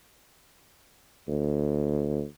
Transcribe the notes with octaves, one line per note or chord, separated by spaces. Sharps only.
D2